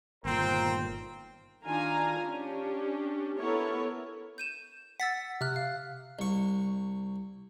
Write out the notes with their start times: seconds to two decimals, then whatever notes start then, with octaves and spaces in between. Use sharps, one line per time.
0.25 G1 A#2 D#3 A#3 C4 A#4 C5 G5
1.64 D#3 D4 F4 F5 G#5 A#5
2.20 C#4 D4 G4
3.37 B3 E4 A4 A#4 C#5
4.38 G6 D#7 E7
5.00 F#5 E6 A6 B6
5.41 C3 F6 F#6
5.56 F5
6.19 C2 C#6